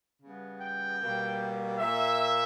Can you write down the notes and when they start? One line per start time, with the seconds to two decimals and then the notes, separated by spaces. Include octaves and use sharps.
0.22 C#3 G3 B3
0.62 G5
1.01 B2 G3 A#3
1.80 A#2 A#3 E5